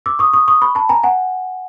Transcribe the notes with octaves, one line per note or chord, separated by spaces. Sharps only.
D6 E6
C#6 D#6
C#6 D#6
C#6 D#6
B5 C#6
A5 B5
G#5 A#5
F#5 G#5